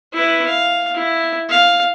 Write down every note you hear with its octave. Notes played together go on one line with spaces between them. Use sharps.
E4 B4
F5
E4
F5